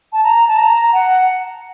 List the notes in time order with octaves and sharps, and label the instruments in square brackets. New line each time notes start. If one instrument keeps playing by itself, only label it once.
[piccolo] A5
A#5
A5
A#5
F#5